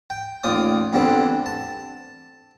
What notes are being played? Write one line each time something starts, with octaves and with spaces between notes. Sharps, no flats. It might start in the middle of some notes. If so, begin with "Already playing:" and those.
G5
A1 D#2 F4 D5 D#6
E2 G2 D3 G3 C4
A5